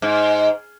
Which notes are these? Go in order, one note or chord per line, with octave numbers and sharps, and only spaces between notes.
G#2